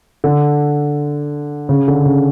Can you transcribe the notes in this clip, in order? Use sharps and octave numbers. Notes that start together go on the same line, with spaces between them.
D3
C#3
D3
C#3